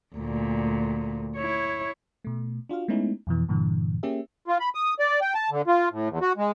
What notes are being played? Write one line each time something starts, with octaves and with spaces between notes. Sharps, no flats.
D2 A#2
E4 C#5
B2 A3
D4 F4 F#4 F5
G#3 A3 B3 C#4 D#4 E4
F2 B2 E3
G2 A#2 D3 E3
A#3 C#4 G4 G#4 E5
F4
B5
D#6
D5
G5
A5
D3
F4
A2
E2
F#4
G#3